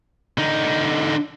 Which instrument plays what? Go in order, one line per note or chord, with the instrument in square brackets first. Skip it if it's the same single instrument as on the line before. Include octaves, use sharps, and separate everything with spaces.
[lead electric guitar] D3 D#4